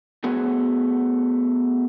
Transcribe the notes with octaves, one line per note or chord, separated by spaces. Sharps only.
A3 B3 F#4 G#4